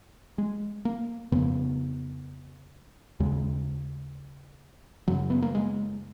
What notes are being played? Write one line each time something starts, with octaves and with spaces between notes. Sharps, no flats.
G#3
A#3
F2 C#3 B3
D#2 C#3 G#3
F#2 C#3 F#3
B3
A#3
G#3